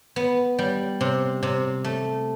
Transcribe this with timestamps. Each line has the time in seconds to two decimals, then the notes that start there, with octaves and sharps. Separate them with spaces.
0.16 B3
0.59 G3
1.01 C3
1.43 C3
1.84 A3